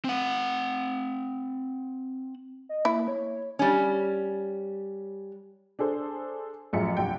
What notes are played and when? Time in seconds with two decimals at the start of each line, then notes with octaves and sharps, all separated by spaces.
0.05 C4 F#5
2.69 D#5
2.85 A#3 E4
3.08 C#5
3.59 G3 C#4
5.79 D4 G#4 A4 C5
6.73 A1 F#2 F3 G#4 E5 C#7
6.97 C2 G2 G5